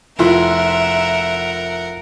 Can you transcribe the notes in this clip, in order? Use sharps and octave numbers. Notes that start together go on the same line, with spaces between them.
F1 E4 F4 A#4 E5 F#5 C6